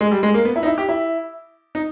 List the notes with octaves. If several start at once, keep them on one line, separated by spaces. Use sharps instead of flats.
G#3
G3
G#3
A#3
B3
E4
D#4
E4
G4
E4
D#4